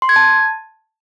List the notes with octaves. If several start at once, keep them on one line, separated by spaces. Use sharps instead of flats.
C6
G#6
A5